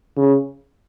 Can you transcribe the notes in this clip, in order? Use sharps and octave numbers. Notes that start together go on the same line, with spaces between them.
C#3